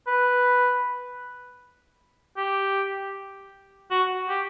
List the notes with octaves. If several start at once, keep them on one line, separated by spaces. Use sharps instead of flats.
B4
G4
F#4
G4